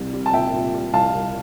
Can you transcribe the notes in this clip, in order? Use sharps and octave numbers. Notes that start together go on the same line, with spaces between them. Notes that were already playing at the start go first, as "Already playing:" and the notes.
Already playing: C2 C3
G3
A5
A#2 E5 G5
A#2
G3
C2 F5 A5
C2